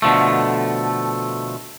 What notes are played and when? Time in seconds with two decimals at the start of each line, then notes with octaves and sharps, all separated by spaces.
0.02 B2 D3 F3 A3